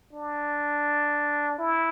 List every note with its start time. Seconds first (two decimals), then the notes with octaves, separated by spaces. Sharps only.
0.13 D4
1.59 E4